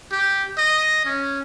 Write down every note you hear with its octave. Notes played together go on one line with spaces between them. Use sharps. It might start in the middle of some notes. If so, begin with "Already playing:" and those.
G4
D#5
C#4